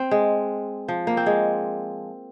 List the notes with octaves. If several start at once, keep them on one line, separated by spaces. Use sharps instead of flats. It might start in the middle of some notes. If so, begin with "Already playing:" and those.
Already playing: C4
G#3
F3
A#3
C4
G#3